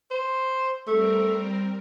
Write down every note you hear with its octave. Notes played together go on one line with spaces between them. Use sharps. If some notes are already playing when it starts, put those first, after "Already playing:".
C5
G3 A3 C4 A#4